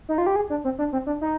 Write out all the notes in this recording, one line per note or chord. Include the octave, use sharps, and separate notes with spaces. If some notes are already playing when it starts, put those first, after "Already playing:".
D#4
F4
G4
G#4
D4
C4
D4
C4
D4
D#4